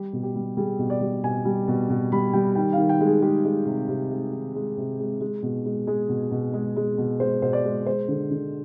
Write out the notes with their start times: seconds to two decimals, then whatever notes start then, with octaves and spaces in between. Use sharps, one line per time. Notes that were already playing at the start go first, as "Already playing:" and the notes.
Already playing: G3 G4
0.13 B2
0.23 G4
0.35 G3
0.57 G3 G#4
0.79 B2
0.90 D5
1.01 G3
1.24 B2 G#5
1.45 G3
1.68 B2
1.90 B2
2.12 G3 B5
2.33 G3 G5
2.55 D#3 G5
2.73 F5
2.78 D#3
2.89 G5
3.00 G#3
3.06 G#4
3.22 G#3 G4
3.45 G#3
3.66 C3
3.88 C3
4.11 G#3
4.33 D#3
4.55 G#3
4.77 C3
5.00 G#3
5.21 G#3
5.43 B2
5.65 G#3
5.87 G#3 G#4
6.09 B2
6.31 B2
6.54 G#3
6.76 G#3
6.98 B2
7.20 G#3 C5
7.42 B2 C5
7.53 D5
7.65 G#3
7.86 G#3 C5
8.08 D3
8.31 D3